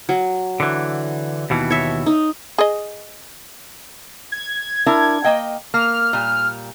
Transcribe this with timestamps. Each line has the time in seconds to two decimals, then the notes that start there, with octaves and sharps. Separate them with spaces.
0.09 F#3
0.60 D3 E3
1.50 D#2 B2 E3
1.70 C#5 E5
2.06 D#4
2.58 G#4 D#5
4.32 G#6
4.86 D4 E4 A#4
5.24 A#3 D#5 G5
5.74 A#3 F6
6.13 A#2 G3